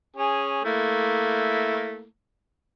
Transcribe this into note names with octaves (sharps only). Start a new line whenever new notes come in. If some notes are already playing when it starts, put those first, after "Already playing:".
C#4 G#4
A3 A#3 E4